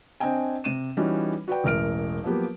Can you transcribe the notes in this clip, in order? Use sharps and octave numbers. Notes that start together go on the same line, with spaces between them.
C4 D4 D#5 G5 G#5
C3 D#7 E7
E3 G3 C#4 D#4 F#4
F#4 B4 D5 G5
E1 A1 A#4 F6 D7
F3 F#3 A#3 B3 G4